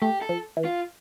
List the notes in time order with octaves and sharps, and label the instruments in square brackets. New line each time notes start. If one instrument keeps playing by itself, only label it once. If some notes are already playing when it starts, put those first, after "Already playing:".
[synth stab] A3 [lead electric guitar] G4
[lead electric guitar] A4
[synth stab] F3
E3
[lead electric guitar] F4